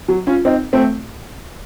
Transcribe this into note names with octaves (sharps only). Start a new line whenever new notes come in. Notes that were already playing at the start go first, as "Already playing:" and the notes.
F#3
C#4 F4
C4 D#4
A3 C4